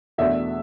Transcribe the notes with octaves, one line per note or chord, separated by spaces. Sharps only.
E2 B2 A3 D4 E5